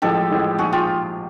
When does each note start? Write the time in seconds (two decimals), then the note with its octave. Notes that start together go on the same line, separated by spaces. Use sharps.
0.02 A1 A2 F3 G#3 G4 A4
0.31 A1 A2 F3 G#3
0.58 A#1 G#2 F3 F#4 G#4
0.72 F4 G4